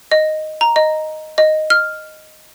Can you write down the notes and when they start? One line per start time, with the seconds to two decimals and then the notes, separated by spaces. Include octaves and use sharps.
0.12 D#5
0.61 A#5
0.76 D#5
1.38 D#5
1.70 F6